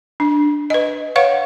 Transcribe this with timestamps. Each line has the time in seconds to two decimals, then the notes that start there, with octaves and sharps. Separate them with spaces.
0.20 D4
0.70 B4 D#5
1.16 B4 C#5 F5 F#5 C#6